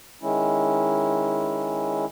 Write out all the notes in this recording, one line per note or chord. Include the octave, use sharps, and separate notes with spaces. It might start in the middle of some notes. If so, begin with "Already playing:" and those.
D#3 G#3 C#4 E4